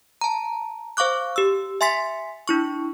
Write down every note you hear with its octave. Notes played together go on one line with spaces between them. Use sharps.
A5 A#5
C5 F5 C#6 D6 F#6
G4 E6
E5 G#5 C6 A6 B6
D4 E4 C#6